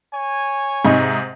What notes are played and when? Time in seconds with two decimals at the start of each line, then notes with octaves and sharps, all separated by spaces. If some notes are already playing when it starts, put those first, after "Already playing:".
0.12 C#5 G#5
0.85 G#2 C3 D#4